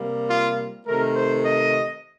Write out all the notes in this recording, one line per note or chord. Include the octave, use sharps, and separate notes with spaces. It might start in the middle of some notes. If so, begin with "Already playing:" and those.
Already playing: C3 G3 A#3
F4
C3 D#3 A3 A#4
C5
D#5